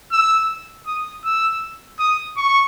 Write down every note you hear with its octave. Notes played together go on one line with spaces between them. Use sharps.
E6
D#6
E6
D#6
C#6